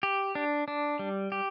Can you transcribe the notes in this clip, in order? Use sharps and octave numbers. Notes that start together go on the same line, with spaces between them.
G4
D4
D4
G3
G4